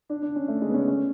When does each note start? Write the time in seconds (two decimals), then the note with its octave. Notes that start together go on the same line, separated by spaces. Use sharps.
0.09 D4
0.22 D4
0.36 C#4
0.48 A3
0.62 G#3
0.69 B3
0.74 C#4
0.88 C#4